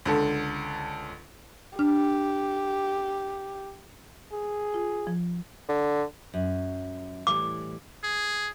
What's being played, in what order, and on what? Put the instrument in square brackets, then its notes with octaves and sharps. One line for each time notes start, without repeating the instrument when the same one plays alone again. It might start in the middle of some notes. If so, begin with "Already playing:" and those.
[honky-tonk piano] C#2 D3 A4
[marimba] D4 F6 [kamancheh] G4
[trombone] G#4
[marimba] F4
F3
[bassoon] D3
[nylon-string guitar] F#2
[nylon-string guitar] A2 E3 G3 [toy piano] D6
[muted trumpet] G#4